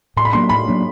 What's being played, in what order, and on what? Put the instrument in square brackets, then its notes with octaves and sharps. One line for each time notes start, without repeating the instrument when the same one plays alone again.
[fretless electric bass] A2 [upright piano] C6
[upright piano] B5
[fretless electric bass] F#3 A#3 D4 [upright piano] C6
[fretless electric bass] A2 [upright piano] B5
[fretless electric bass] F#3 A#3 D4